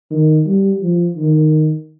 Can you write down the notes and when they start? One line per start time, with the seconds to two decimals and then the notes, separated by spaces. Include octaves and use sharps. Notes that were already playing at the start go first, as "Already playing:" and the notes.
0.11 D#3
0.46 G3
0.81 F3
1.17 D#3